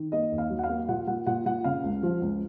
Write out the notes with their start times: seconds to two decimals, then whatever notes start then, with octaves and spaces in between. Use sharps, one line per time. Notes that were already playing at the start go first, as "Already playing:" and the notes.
Already playing: D#3
0.12 A#3 D#5
0.32 D#2
0.38 F5
0.50 F#3
0.59 F#5
0.63 F5
0.69 A#3
0.89 A#2 F#5
1.07 A#2 F#5
1.27 A#2 F#5
1.46 A#2 F#5
1.64 C#3 F5
1.84 C#2
2.03 F3
2.22 C#2